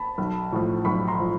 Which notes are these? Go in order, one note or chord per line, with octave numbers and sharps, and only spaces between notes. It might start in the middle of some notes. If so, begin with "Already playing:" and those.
Already playing: A5 B5
B1
A2 F3
B1 B5 C#6
A#5 C6
A2 F3